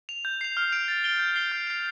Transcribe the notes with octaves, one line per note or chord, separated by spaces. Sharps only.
F7
G6
C7 F7
F6
D7 F7
A6
D7 G7
G6
C7 G7
G6
C7 F7